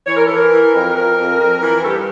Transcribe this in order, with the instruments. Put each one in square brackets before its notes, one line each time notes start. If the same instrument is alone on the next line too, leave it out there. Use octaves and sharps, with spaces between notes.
[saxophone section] E3 C#5
A#4
E3 A4
A#4
E3
F2
F2 A#4
F2
F2
E3
G2 A4
G4